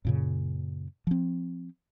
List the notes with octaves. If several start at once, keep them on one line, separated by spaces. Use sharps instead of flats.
F#2 A#2 C#3
F3 C4